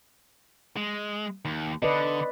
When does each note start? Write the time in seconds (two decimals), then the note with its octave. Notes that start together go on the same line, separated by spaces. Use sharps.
0.77 G#3
1.45 D#2
1.82 D3 B4 D5 D#5